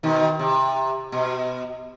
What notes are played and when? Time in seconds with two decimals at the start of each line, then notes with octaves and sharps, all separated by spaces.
0.03 B2 D#3
0.39 C3
1.12 B2